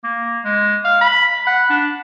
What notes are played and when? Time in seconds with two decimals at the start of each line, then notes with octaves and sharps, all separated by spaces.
0.04 A#3
0.44 G#3
0.85 F5
1.01 B5
1.47 F#5
1.70 D4